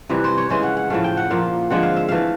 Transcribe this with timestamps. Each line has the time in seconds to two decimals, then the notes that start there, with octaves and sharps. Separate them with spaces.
0.09 C3 E3 G3 B4
0.24 C5
0.37 C#5
0.50 C#3 E3 G#3 C#4 C5
0.63 F#5
0.77 F#5
0.90 A2 F3 A3 F5
1.04 G5
1.17 F#5
1.31 A#2 F3 A#3 F5
1.70 D3 F3 G#3 C4 F#5
1.83 F5
1.96 E5
2.09 E3 A3 F5